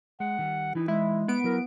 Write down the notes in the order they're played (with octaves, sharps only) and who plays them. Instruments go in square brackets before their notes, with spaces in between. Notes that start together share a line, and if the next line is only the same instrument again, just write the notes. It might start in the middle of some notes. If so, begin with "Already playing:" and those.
[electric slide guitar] G#3 [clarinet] F#5
[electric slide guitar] D#3 G3
[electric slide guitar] E3 D#4 [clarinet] E4
[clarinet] G#3 [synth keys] E4
[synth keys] B3 D7 [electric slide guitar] F#5
[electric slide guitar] F#3 E4 [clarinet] A#4